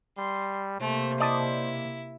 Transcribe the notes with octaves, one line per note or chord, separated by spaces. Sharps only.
G3 C6
C3 A3 A#3 C5
E4 D5 D#5 A5